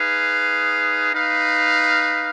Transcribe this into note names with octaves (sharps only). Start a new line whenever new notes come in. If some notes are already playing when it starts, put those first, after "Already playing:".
Already playing: D#4 G#4 B4 F5
D#4 B4 F5